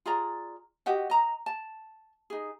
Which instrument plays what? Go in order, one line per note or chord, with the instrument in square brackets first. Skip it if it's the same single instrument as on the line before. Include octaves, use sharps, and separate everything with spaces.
[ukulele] F4 G#4 D5 A#5
F#4 G4 D#5 F#5
D#5 A#5
A5
D#4 G#4